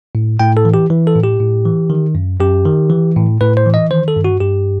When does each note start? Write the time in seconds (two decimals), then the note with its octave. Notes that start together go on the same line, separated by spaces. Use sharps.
0.15 A2
0.40 A2 G5
0.57 A4
0.65 E3
0.74 G4
0.90 E3
1.07 A4
1.16 A2
1.23 G4
1.40 A2
1.65 E3
1.90 D#3
2.15 F#2
2.40 F#2 G4
2.66 D#3
2.90 E3
3.16 A2
3.41 A2 B4
3.57 C5
3.66 E3
3.74 D#5
3.91 D#3 C5
4.08 A4
4.16 G2
4.25 F#4
4.40 G2 G4